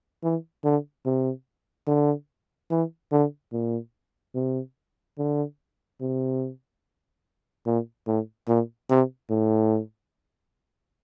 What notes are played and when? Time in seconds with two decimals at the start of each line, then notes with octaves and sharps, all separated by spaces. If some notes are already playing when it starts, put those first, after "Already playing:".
0.23 E3
0.64 D3
1.05 C3
1.87 D3
2.71 E3
3.12 D3
3.52 A#2
4.35 C3
5.18 D3
6.01 C3
7.66 A#2
8.07 A2
8.48 A#2
8.90 C3
9.30 A2